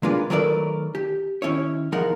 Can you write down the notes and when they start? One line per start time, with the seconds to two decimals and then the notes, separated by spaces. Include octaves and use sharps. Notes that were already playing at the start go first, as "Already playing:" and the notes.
0.03 G#3 A#3 D4 F4 B4 D5
0.30 D#3 F#3 A3 A#4 B4 D5
0.95 G4
1.42 D#3 C#4 E4 C#5
1.92 E2 F3 G#3 D#4 A#4 F#5